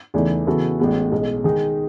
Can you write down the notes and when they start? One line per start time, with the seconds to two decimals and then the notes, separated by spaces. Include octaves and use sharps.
0.14 E2 C#3 E3 A3 D#4
0.47 C#3 E3 B3 F#4 A4
0.80 A1 A2 G#3 B3
1.12 B1 B2 G#3
1.44 D#3 G#3 D#4 G#4